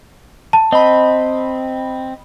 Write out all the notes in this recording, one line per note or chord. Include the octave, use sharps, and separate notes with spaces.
A5
C4 D#5 B5